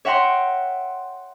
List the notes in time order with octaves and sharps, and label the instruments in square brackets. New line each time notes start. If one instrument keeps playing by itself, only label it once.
[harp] C#5 E5 F#5 G5 A#5 C6